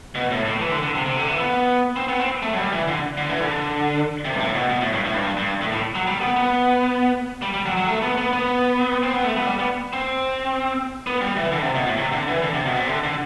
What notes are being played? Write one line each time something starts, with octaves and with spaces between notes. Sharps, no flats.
B2
A2
A2
E3
D3
D3
C3
C3
D3
E3
B3
C4
B3
C4
A3
F#3
G3
E3
D3
D3
E3
D3
C3
G2
A2
B2
B2
A2
G2
A2
G2
G2
A2
A2
F#3
G3
B3
B3
G3
G3
F#3
F#3
A3
B3
B3
B3
C4
B3
A3
B3
G3
B3
C4
B3
G3
E3
D3
C3
B2
A2
C3
D3
E3
D3
C3
B2
C3
D3
D3